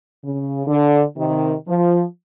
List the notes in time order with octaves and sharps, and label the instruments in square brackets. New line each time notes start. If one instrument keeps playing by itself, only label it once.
[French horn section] C#3
D3
C3 D#3
F3